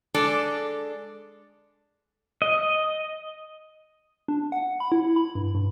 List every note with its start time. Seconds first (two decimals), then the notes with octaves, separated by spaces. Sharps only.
0.14 G#3 D4 A4 D5
2.42 D#5
4.28 D4
4.52 F#5
4.80 B5
4.92 E4
5.16 B5
5.35 G2
5.55 G2